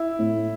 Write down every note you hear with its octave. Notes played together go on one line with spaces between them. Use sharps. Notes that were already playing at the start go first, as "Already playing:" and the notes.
Already playing: E4
A2